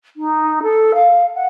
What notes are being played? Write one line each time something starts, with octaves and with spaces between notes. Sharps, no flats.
D#4
A4
F5
F#5